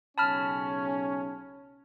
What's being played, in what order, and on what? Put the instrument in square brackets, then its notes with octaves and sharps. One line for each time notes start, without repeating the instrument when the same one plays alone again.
[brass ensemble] B1 C#3 C#4 [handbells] A5 B5 F6